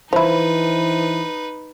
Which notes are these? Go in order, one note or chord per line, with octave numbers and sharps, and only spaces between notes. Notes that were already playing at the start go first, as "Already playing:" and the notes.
E3 F3 D#4 E4 B4 C5